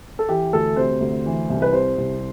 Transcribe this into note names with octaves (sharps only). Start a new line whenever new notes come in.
A4
E3 G4
D2 A4
C3 C5
D2
E3
C2
B4
C3 C5
C2